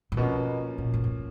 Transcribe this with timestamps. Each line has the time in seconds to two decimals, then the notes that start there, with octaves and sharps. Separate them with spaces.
0.12 A#2
0.17 B2 F3 A#3 C#4
0.78 A#2
0.94 A2
1.04 A2